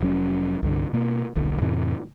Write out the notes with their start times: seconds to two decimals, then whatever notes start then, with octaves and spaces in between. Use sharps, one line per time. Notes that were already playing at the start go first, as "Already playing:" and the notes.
0.01 F1 F#3 C#4
0.63 C2 G2 D3
0.93 B2 A#3
1.36 D#1 B1 D3
1.61 F2 A2 C3 E3